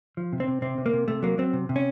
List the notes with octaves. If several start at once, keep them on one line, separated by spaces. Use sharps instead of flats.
F3
C3
C4
C3
C3 C4
C3
A#3
C3
C3 A3
F#3 A#3
F#3 C4
C3
C3
C#4